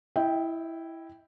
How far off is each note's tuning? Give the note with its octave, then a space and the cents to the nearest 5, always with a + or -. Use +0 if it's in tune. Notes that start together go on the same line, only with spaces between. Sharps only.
E4 +0 D#5 +35 G5 +0